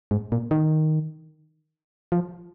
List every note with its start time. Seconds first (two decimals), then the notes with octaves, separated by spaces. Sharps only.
0.11 G#2
0.32 A#2
0.51 D#3
2.12 F3